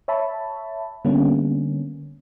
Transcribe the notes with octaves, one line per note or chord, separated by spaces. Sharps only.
C#5 E5 A5 B5
D3 G3 A#3 B3 C#4